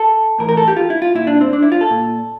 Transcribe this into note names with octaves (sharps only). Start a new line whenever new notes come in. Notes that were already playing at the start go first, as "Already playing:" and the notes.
Already playing: A4
A2 E3 A#4
A#4
A4
G4
F4
E4
F4
A#2 E4
D4
C4
D4
E4
F4
A4
A#2